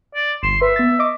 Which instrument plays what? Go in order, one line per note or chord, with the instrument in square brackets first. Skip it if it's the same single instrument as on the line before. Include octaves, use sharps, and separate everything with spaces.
[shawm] D5
[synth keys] G1 E7 [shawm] C6
[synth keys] B4 [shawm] E5
[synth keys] B3 A6
D#5 C#6 D6